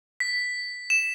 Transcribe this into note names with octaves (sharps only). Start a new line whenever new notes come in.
B6
E7